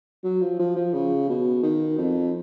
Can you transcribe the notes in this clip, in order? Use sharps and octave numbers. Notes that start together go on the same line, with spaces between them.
F#3
F3
F3
F3
C#3
B2
D#3
F2